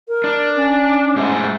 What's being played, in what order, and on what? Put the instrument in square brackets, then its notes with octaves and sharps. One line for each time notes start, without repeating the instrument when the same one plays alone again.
[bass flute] A#4
[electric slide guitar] D4
[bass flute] C#4
[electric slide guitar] G#2 A3 G#4